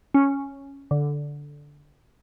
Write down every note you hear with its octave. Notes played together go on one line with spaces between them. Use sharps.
C#4
D3